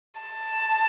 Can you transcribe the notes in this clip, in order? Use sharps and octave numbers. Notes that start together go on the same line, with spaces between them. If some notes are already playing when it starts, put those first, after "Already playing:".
A5